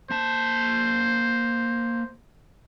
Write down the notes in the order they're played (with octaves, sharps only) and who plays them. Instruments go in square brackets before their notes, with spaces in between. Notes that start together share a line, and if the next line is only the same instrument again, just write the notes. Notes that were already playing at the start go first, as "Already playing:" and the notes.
[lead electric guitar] A#3 A5 [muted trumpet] C5